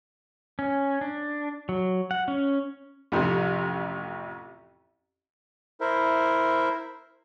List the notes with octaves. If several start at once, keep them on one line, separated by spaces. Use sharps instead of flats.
C#4
D4
F#3
F#5
C#4
A1 F2 C3
E4 A#4 C5 E5